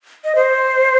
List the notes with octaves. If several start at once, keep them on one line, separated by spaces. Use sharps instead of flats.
D#5
C5